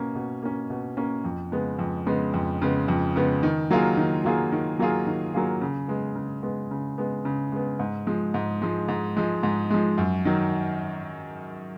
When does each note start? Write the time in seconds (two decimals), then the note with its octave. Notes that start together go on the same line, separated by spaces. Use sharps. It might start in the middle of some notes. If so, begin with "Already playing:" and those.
Already playing: B2 A#3 C#4
0.15 B2
0.42 A#3 C#4
0.70 B2
0.97 A#3 C#4
1.24 F2
1.52 C#3 G#3 B3
1.79 F2
2.06 C#3 G#3 B3
2.34 F2
2.62 C#3 G#3 B3
2.88 F2
3.16 C#3 G#3 B3
3.43 D#3
3.71 F#3 A#3 F4 G#4
3.97 D#3
4.25 F#3 A#3 F4 G#4
4.52 D#3
4.79 F#3 A#3 F4 G#4
5.07 D#3
5.34 F#3 A#3 F4 G#4
5.61 C#3
5.88 G#3 B3
6.16 C#3
6.43 G#3 B3
6.71 C#3
6.98 G#3 B3
7.25 C#3
7.52 G#3 B3
7.79 G#2
8.07 F3 G#3
8.34 G#2
8.62 F3 G#3
8.88 G#2
9.17 F3 G#3
9.43 G#2
9.70 F3 G#3
9.98 F#2
10.25 D#3 F#3